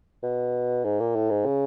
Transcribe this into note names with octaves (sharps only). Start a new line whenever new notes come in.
B2
G#2
A#2
A2
G#2
C#3